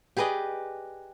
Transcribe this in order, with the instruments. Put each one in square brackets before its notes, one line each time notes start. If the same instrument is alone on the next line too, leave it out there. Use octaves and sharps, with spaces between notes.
[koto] G4 G#4 B4 D5 D#5